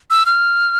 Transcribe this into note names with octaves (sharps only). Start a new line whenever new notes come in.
E6
F6